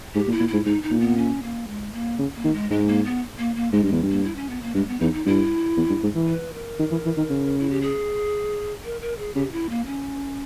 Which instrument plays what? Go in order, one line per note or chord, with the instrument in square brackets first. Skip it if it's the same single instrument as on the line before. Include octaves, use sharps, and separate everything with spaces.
[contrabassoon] G#2 [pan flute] G4
[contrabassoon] A#2
[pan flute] E4
[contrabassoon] A#2
[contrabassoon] G#2 [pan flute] E4
[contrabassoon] G#2 [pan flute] D#4
[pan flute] D#4
[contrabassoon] A#2
[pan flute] B3
C#4
A#3
G#3
A#3
[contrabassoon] C#3
[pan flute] A#3
[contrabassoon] D#3
[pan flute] G#3
[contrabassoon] G#2 [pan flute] G#3
[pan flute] A#3
B3
A#3
A#3
[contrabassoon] G#2 [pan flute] G#3
[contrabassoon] G2 [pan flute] G#3
[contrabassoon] E2
G2
[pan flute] A#3
E4
C#4
B3
A#3
[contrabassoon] G2 [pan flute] G#3
[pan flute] B3
[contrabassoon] E2 [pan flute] D#4
[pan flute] D#4
[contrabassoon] G2 [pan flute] E4
[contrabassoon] E2
G2
G#2
E3
[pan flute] B4
A#4
[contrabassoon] D#3
E3
E3
D#3
C#3
[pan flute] E4
G4
G#4
A#4
A#4
G#4
[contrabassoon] C#3 [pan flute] G4
[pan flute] E4
A#3
C#4